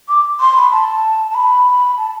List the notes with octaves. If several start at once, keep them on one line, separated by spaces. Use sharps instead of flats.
D6
C6
B5
A5
A5
B5
A5